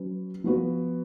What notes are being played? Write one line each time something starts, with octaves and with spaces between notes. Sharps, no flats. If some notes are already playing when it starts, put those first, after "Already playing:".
Already playing: F#3 C#4 F#4 B4
F3 B3 F#4 B4